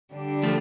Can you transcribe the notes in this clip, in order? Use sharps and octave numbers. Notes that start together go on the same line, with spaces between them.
D3 G3 D4
F3 A3